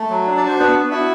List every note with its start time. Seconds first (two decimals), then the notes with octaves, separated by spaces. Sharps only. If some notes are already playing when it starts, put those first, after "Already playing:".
Already playing: A3
0.10 F#3
0.26 D4
0.37 D5
0.43 F#4 C5
0.59 B3 D4 B4
0.76 B3
0.91 E4 F#4 E5